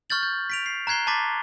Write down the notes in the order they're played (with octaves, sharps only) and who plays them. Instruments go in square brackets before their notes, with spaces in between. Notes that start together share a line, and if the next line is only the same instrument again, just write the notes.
[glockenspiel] C#6 F6 G6 A6 F#7
G6
B6 D7 F7
C7
A#5 F#6 G#6 C7 G7
A5 A#5 C6 D6 A6 B6